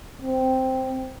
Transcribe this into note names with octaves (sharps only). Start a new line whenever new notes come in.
C4